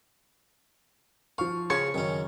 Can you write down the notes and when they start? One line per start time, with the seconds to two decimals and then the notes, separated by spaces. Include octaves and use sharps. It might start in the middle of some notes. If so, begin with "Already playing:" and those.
1.38 F3 F5 C#6
1.70 C#3 F4 G#4 A5 C#6 G#6
1.94 F#2 D#3 C#4